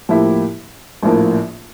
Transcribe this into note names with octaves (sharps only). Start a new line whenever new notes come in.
A2 F3 A#3 E4 G4
A#1 A2 F3 A#3